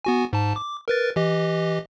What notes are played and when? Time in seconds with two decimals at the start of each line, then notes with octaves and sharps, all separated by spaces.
0.05 B3 F#4 G#5
0.33 G#2 A5
0.56 D6
0.88 A#4 B4 A6
1.16 E3 G4 D#5